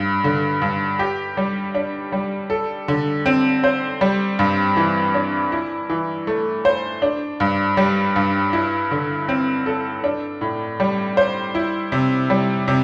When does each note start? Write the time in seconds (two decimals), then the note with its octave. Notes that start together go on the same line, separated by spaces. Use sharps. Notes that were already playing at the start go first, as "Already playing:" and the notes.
Already playing: G2
0.24 D3
0.62 G2
0.99 G4
1.37 G3
1.75 D4
2.12 G3
2.50 A4
2.88 D3
3.26 C4
3.64 C5
4.01 G3
4.39 G2
4.77 E3
5.14 D4
5.52 E4
5.90 E3
6.27 A3
6.65 C5
7.02 D4
7.40 G2
7.77 G3
8.16 G2
8.53 E4
8.91 D3
9.29 C4
9.66 A4
10.04 D4
10.41 A2
10.80 G3
11.17 C5
11.55 E4
11.92 C3
12.30 G3
12.68 C3